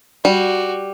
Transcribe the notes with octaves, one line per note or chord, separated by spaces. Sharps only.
G3 F#4